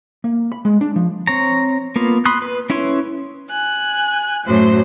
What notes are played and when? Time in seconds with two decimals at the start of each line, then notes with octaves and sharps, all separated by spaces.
0.24 A#3
0.52 B5
0.65 G#3
0.81 D4
0.96 F3
1.27 C4 C#5 A#5
1.96 A#3 B3 F4
2.25 B5 C6 D#6 F#6
2.42 B4
2.70 C#4 E4 B4 C#5 C6
3.49 G#5 F#6
4.45 F#2 A2 F#3 C5